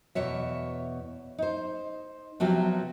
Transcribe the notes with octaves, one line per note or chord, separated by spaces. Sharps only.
E2 B2 C#5 E5
D#4 C5
C3 F3 F#3 B3